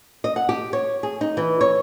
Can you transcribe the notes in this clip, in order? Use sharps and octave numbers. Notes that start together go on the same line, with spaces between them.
D#5
F#5
G4
C#5
G#4
D#4
E3
C#5